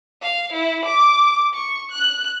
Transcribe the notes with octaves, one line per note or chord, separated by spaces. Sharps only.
F5
E4
D6
C#6
F#6